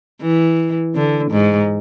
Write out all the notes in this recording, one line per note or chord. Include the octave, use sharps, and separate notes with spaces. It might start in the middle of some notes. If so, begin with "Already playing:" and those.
E3
D3
G#2